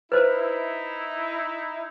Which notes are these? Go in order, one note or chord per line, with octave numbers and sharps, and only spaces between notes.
D#4 E4 B4 C5